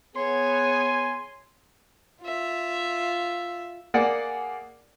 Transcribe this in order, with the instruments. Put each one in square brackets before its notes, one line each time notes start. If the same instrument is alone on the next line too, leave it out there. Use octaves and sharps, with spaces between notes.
[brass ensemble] B3 G#4 [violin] C#5 [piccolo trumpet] G#5 [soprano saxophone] C6
[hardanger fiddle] F4 E5
[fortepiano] A#3 G#4 D5 F#5